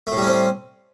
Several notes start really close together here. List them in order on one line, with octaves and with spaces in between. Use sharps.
A3 A2 G3 C#4 C4